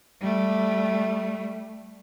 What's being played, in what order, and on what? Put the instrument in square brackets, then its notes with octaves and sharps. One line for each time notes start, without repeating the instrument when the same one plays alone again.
[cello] G3 A3